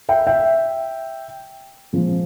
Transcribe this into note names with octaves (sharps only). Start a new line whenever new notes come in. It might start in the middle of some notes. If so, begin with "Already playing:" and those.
E5 G5
E5 G5
A#2 F3 G#3